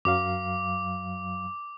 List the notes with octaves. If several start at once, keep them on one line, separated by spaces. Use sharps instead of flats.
F#2 F#3 F5 D6